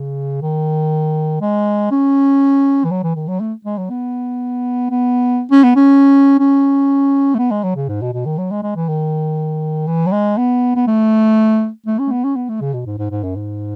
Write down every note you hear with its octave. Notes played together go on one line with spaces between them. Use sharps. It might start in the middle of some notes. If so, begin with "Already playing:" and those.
Already playing: C#3
D#3
G#3
C#4
E3
F#3
E3
D#3
F#3
A3
G#3
F#3
B3
B3
C#4
B3
C#4
C#4
A3
B3
G#3
F#3
C#3
G#2
B2
B2
D#3
F#3
G#3
G#3
E3
D#3
E3
F#3
G#3
B3
B3
A3
A3
C#4
A3
B3
C#4
B3
A3
C#3
B2
G#2
G#2
G#2
F#2
G#2